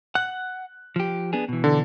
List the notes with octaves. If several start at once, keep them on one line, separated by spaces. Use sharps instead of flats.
F#5 F#6
F3 G4
B3 D4 G#4
B2 E3
D3